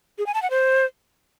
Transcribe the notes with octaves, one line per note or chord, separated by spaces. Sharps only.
G#4
G#5
A5
F#5
C5